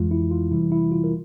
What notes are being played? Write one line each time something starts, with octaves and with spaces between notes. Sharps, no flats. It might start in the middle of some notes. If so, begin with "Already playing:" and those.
Already playing: F2 E3 G#3 F4
E4
F4
C3 E3 G3 E4
E4
F4
A#4